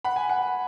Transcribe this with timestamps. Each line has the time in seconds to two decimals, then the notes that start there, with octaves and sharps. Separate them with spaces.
0.04 F#5 B5
0.16 G#5
0.29 F#5